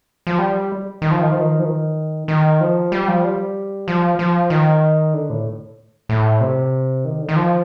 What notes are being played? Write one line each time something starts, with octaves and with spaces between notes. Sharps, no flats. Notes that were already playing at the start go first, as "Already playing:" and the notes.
F3
G3
D#3
F3
D#3
F3
D#3
F3
D#3
D#3
F3
G3
F3
G3
F3
F3
D#3
D3
A2
A2
C3
D#3
D3
D#3
F3